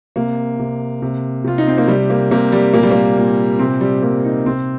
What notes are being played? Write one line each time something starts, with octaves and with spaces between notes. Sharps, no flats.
C3 A#3
C3
C3
C3 F4
D#4
C4
A#3
C3 G3
A#3
C3 A#3
G3
A#2 A#3
G3
A#3
A#2
C3 C4
G3
G3 A#3
D#4
C3 C4